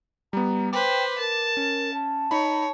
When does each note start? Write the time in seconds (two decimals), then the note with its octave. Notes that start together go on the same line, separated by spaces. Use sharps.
0.33 G3 B3 A#5
0.73 B4 C5 G5 D6
1.18 A#4 A5
1.57 C#4
1.94 A5
2.31 D#4 C#5 B5